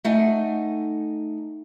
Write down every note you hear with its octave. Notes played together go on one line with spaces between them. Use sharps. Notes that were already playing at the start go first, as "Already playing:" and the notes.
A3 D#4 F#5 G#5